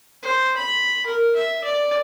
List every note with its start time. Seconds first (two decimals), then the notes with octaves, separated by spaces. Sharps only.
0.23 C5
0.56 B5
1.06 A#4
1.36 E5
1.64 D5